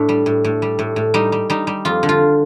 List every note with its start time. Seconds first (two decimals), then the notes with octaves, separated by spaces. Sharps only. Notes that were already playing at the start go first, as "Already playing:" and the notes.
Already playing: A2 D4
0.09 G3
0.26 A2
0.44 A2
0.62 G3
0.79 A2
0.96 A2
1.14 G3 D#4
1.32 G3
1.50 G3 D#4
1.67 G3
1.85 F2 F4
2.03 D3
2.09 F4